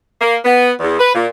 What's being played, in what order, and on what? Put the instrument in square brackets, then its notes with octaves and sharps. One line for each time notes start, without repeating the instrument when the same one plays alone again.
[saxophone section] A#3
B3
E2
B4
A#2